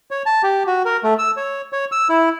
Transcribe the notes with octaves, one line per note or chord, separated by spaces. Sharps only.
C#5
A5
G4
F#4
A#4
A3
E6
C#5
C#5
E6
E4